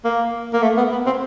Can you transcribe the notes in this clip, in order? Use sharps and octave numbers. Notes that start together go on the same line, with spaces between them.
A#3
A#3
A3
B3
B3
C4